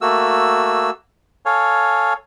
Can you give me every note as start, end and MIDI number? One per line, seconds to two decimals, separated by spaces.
0.01 0.90 57
0.01 0.90 58
0.01 0.90 66
0.01 0.90 88
1.46 2.13 69
1.46 2.13 73
1.46 2.13 77
1.46 2.13 80